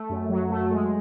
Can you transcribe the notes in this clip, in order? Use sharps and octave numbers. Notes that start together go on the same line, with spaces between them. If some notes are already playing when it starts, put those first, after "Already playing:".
Already playing: A3
F#2
F#3
A3
G#3